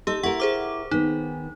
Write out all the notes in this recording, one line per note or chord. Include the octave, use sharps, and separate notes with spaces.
D#4 G4 A4 E6
E4 G4 A#4 F#5 C#6
G#4 C5 D6
D#3 B3 D#4